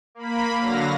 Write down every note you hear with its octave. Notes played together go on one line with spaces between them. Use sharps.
A#3 B5
D3 F#3 F5 A#6